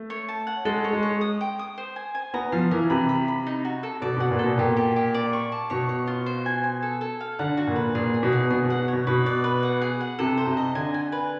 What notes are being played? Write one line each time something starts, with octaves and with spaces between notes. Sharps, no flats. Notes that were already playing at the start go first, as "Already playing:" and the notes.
Already playing: A3
C#5
A5
F#5
G#3 A4
C#5
G#3
C#5
D#6
G5
D#6
C5
G#5
G#5
B3 A#5
F3 F5
E3 A#4
C3 B5
B5
B5
D#4
F#4
A4
B2 D5
B2 F#5
A#2
A4
B2
A#2 G4
G4
G4
D5
C#6
A5
B2 C#5
C#5
F4
C5
G#5
G#5
A4
A4
F5
D3 F#5
F#4
A#2
B4
A#2 G#4
G#4
B2
G#4
B2 G#4
B2
F#5
B2 C#5
B2 B4
D5
B4
F#5
G#4
F#5
C3 A4
C5
C3
D#5
D3 G#5
G#5
B4